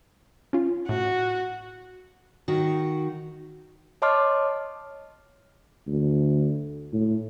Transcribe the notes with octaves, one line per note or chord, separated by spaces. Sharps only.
C#4 F4
A2 F#4
D#3 F#4
C#5 D#5 A5 C6 D6 F6
D2
A2